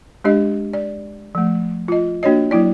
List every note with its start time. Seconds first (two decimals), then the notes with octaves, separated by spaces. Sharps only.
0.24 G#3 D4 G4 D#5
0.73 D5
1.35 F3 A3
1.88 F4 D#5
2.23 A#3 D4 F#4 C#5 D#5
2.51 F#3 A#3 E4 D5